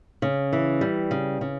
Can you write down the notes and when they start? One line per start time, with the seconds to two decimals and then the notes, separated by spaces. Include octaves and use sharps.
0.22 C#3
0.53 E3
0.81 G3
1.11 C#3
1.41 C#3